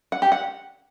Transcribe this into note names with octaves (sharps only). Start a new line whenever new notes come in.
F#5
G4
F#5